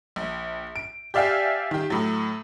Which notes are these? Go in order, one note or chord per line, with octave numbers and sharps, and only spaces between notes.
A#1
D7
G4 D5 E5 F5 G5 G#5
D#3 G4
A2 F#3